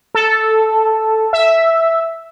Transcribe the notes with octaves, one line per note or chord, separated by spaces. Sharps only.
A4
E5